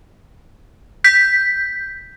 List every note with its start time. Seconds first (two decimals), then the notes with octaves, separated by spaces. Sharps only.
1.04 G6 B6